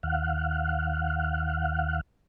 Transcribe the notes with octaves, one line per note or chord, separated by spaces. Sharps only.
D#2 F5 F#5